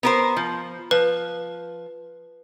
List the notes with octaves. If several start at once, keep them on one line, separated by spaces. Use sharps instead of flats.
B3 A#4 C5
F3
F3 B4